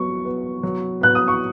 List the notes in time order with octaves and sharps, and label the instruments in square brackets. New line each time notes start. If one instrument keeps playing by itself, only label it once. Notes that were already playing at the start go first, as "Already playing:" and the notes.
Already playing: [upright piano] F#3 B3 F#4 [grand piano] C#6
[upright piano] B3 F#4 B4
F#3
[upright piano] B3 F#4 B4 [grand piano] F#6
[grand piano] D#6
C#6